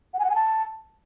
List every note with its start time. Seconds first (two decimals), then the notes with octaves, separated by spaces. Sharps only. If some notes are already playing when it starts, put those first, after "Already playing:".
0.13 F#5
0.19 G#5
0.24 F#5
0.30 G#5
0.35 A5